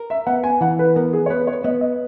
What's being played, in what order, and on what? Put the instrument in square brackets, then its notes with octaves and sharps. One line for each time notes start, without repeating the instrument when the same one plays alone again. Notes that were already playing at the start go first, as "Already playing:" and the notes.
Already playing: [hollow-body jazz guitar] A#4
[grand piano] E5
[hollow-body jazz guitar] B3 [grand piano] F#5
[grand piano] G#5
[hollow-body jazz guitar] E3 [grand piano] F#5
[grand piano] B4
[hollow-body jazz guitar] B3 [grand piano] A#4
[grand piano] G#4
C#5
[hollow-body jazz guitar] B3 [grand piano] B4
[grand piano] C#5
[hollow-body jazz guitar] B3 [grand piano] D#5
[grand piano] D#5